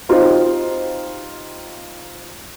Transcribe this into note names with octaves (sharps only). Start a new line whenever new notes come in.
C4 D#4 F4 G4 C5